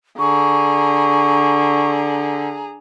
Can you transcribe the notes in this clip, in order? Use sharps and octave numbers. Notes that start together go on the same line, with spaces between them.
D3 G#4 A#5 C#6